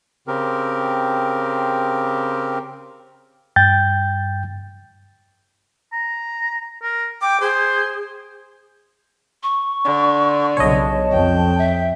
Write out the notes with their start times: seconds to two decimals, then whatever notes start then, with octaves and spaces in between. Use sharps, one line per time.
0.28 C#3 C4 G4 A#4
3.56 G2 G5 G6 A6
5.92 A#5
6.82 A#4
7.22 G5 D6
7.41 G#4 C5
9.43 C#6
9.85 D3
10.57 B1 C#3 C#5 D#5 A5
11.12 F2 G5
11.58 E5